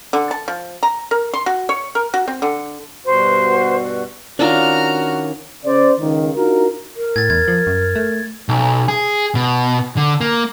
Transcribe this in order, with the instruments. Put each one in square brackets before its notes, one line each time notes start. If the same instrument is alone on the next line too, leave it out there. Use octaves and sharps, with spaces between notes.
[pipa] D3
A5
F3
A#5
A#4
C6
F#4
C#5
A#4
F#4
C4
D3
[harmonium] G2 B2 F#4 [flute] C5
[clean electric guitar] D#3 C#4 [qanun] D4 F4 [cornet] F#4 [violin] A#5 F6
[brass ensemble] C#3 C5 D5
C#2 D#3
D4 D#4 F4 F#4 A#4
[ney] A#4
[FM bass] A2 [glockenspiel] G#6 A6
[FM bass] E2 [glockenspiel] G#6
[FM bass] F3
F#2
A3
[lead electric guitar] B1
G#4
B2
D3
A#3